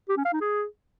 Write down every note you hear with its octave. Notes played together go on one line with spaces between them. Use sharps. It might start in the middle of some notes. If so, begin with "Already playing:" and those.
G4
C#4
F5
D#4
G#4